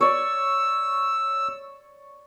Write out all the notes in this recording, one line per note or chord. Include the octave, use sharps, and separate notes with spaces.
C#5 D5 E6